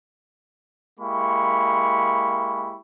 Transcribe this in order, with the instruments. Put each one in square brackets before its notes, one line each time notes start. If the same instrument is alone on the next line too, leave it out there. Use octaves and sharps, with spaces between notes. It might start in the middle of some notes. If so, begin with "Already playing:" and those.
[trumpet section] G#3 A#3 E4 G4 B5 C#6